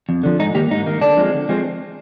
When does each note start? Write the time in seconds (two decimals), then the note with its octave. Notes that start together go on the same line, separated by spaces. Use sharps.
0.09 F2
0.24 D3 F3
0.39 G#2 D#4
0.55 D#3 A#3 G4
0.70 G#2 D#4
0.86 D#3 A#3
1.01 D3 D4
1.17 F3 G#3 C4
1.33 D3
1.49 F3 G#3 C4